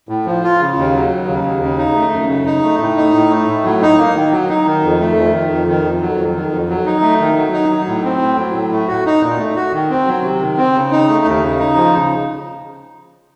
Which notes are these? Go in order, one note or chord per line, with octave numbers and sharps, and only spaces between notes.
A2
F3
F4
C#3
D#2
F#3
D#2
C#3
D#2
C#3
D#4
A3
F#2
C#3
D#4
A3
A2
D#4
A2
A3
A2
F#3
D#4
A#3
D#3
F#3
D#4
D#3
F2
A3
F2
D#3
F2
D#3
F2
F#3
F2
D#3
F2
F#3
D#4
A3
D#3
F#3
D#4
F#3
A2
C4
A2
F#3
A2
A3
F#4
D#4
A#2
A3
F#4
D#3
C4
F#3
C3
D#3
C4
C#3
D#4
A3
D#2
C#3
D#4
F3
C#3